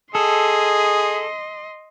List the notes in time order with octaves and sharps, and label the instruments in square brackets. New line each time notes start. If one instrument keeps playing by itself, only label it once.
[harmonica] G#4 [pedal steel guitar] A4 [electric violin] D#5 C6